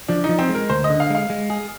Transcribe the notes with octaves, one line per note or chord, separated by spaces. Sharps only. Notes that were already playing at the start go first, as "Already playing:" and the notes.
F3 D4
D#4
F3
C4
G#3
A#4
D2 C5
D#5
D3
F5
G#3 F5
G#3
G#4